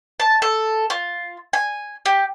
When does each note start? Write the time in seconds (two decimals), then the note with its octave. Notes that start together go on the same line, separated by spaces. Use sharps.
0.20 A5
0.42 A4
0.90 F4
1.53 G#5
2.06 G4